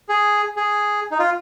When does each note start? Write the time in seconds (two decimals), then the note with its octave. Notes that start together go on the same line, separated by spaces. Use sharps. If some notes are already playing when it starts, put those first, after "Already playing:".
0.09 G#4
0.56 G#4
1.11 D#4
1.19 F4